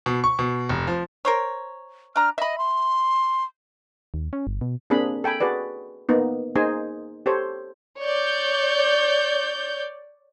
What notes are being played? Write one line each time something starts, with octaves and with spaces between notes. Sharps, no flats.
B2
C#6
B2
F1
F3
A#4 C5 C#5
D4 A#5 F6
D#5 E5 B5
C6
D#2
C#4
G1
B2
A#3 C4 D4 G#4 B5
A4 G5 G#5 B5
F#4 G#4 B4 D5
A#3 B3 D#4
A#3 D#4 G#4 C5 D#5 G#5
G4 A4 C5 C#5
C#5 D5 G6